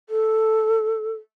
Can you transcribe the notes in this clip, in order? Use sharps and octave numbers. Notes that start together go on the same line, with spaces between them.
A4